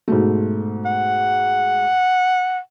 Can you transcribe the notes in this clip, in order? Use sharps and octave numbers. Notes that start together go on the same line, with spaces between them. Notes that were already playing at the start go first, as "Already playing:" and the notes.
G#2 B2 A3
F#5